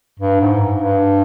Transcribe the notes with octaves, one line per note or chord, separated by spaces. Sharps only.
G2
G#2
G2